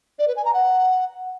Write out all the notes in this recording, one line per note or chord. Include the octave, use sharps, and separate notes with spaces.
D5
B4
G#5
A#5
F#5